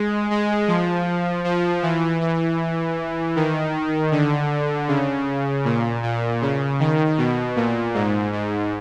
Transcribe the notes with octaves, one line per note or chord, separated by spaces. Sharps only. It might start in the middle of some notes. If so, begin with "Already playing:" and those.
Already playing: G#3
G#3
F3
F3
E3
E3
D#3
D3
C#3
A#2
A#2
C#3
D#3
B2
A#2
G#2
G#2